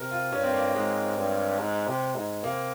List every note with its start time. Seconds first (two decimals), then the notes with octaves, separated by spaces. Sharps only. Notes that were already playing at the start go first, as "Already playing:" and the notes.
Already playing: C3 A#4
0.11 F4
0.32 G2 C#4
0.43 C4
0.54 A#3
0.75 G#2 G#3
1.17 G2
1.59 G#2
1.87 C3
2.15 G#2
2.44 C3 A#3